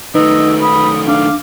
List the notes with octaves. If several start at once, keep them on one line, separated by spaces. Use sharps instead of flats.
D#3 A3 D#4 B4 D#5 E6
B5 D#6
D4 F5 D6